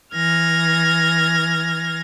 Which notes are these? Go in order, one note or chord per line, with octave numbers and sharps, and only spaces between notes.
E3 F6 G#6 A#6